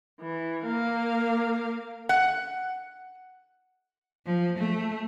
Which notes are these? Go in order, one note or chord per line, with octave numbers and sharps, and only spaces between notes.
E3
A#3 F5
F#5
F3
A3